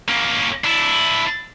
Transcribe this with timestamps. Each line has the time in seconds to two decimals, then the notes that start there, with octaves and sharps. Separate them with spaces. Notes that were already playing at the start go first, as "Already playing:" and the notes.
0.09 A#3 C#4
0.64 D4 E4